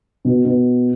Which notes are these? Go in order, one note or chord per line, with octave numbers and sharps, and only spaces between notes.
B2
B2